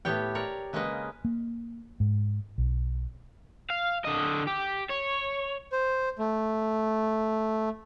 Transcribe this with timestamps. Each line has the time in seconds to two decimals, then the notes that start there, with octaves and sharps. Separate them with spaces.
0.05 A2 B3 G4 C#5 G5
0.35 A#4 C#5 D5
0.73 C#3 G#3 A#3 C#4 B4 D#5
1.25 A#3
2.00 G#2
2.58 B1
3.70 F5
4.05 D3 D#5
4.47 G4
4.90 C#5
5.72 C5
6.19 A3